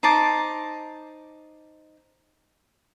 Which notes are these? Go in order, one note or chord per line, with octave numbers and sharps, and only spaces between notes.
D#4 C5 A5 D6